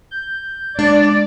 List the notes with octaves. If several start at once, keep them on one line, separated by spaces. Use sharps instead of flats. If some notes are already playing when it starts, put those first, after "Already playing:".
G6
G#3 D4 D5